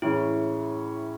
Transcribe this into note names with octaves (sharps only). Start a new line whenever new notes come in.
A2 E3 G#3 C#4 E4